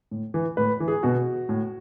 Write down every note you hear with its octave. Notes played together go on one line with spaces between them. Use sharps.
A2
E3
A2 B4
E3
G#4
B2 F#4
A2